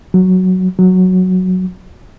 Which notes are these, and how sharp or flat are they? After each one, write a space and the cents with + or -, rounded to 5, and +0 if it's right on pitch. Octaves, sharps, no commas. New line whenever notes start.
F#3 +0
F#3 -5